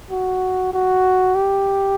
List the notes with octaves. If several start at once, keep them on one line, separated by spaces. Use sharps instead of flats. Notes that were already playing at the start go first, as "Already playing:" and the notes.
F#4
F#4
G4